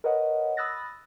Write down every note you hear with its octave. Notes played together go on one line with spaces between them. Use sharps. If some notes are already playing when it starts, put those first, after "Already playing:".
A#4 B4 C#5 D#5 F#5
B5 D#6 E6 F#6 A6 A#6